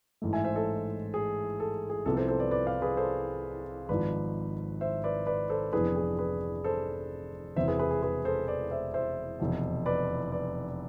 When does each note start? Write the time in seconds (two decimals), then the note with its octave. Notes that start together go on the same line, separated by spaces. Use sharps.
0.22 A1 G#2 E3 A3
0.33 E5 G#5
0.45 C5 E5
0.56 A4
1.14 G#4
1.60 A4
1.90 G#4
2.06 C2 C3 F3 B3 A4
2.16 A4 C5
2.28 A4 C5
2.40 B4 D5
2.51 B4 D5
2.67 D5 F5
2.82 G#4 B4
2.97 A4 C5
3.89 G#1 G#2 F3 B4 D5
4.81 C5 E5
5.04 B4 D5
5.27 B4 D5
5.50 A4 C5
5.73 F1 F2 E3 B3 D4 G#4 B4
5.96 G#4
6.19 G#4 B4
6.64 A4 C5
7.56 E1 E2 C3 E3 B3 C5 E5
7.68 G#4 B4
7.79 G#4 B4
7.91 G#4
8.02 G#4 B4
8.25 A4 C5
8.48 B4 D5
8.71 C5 E5
8.94 C5 E5
9.39 F1 E2 B2
9.86 B4 D5
10.32 B4 D5